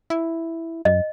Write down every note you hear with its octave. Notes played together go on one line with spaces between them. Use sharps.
E4
F#2 D#5